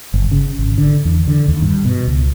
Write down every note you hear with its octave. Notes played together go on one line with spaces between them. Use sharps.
G1
C#3
G#1
D3
E2
D3
D#2
G2
B2
C#2